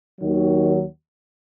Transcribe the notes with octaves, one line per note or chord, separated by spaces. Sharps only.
D#2 D#3 F#3